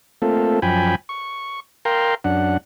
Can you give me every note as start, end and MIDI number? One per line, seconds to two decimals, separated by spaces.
0.22 0.60 57
0.22 0.60 58
0.22 0.60 60
0.22 0.60 65
0.22 0.60 69
0.62 0.95 42
0.62 0.95 53
0.62 0.95 79
0.62 0.95 80
0.62 0.95 83
1.09 1.60 85
1.85 2.15 70
1.85 2.15 77
1.85 2.15 79
1.85 2.15 82
1.85 2.15 84
2.24 2.57 42
2.24 2.57 62
2.24 2.57 78